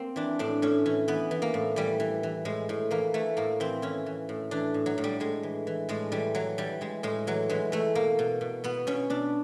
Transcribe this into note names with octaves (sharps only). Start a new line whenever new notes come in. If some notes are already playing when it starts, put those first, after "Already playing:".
Already playing: A#3 C4
E3 D4
A2 D4
A2 C#4
E3 C#4
E3 B3
E3
A#3
A2
E3 G3
E3
E3
A2 G#3
A2
E3 A#3
E3 A3
A2 A#3
E3 C4
E3 C#4
E3
A2
E3 D4
A2
F#3
A2
G3
A2 G#3
E3
E3
A2 G#3
E3 G3
E3 F#3
E3 G3
E3 G#3
A2 G#3
E3 F#3
E3 G#3
E3 A3
B2 A#3
B2
B2
B2 B3
B2 C#4
B2 D4